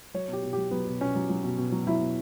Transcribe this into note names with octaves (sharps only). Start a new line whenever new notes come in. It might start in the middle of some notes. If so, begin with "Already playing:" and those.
F#3 C#5
B2 G4
B2
F#3 G4
F#3 B3
B2
B2 C#4
F#3
F#3
B2
B2
F#3
F#3 E4
B2